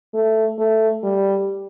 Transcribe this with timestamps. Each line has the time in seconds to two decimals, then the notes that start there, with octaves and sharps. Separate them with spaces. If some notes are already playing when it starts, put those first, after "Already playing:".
0.14 A3
0.58 A3
1.03 G3